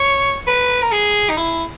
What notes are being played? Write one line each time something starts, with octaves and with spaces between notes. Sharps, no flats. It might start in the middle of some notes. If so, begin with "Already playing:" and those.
Already playing: C#5
B4
A#4
G#4
D#4
E4